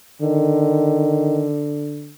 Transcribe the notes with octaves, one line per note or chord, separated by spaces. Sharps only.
D3 D#3